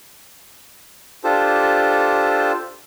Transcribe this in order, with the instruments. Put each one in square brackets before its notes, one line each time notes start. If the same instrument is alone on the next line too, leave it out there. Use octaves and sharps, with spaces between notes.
[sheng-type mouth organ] D4 F4 G4 A4 C5 A5